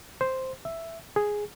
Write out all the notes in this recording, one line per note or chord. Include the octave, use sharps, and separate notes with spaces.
C5
E5
G#4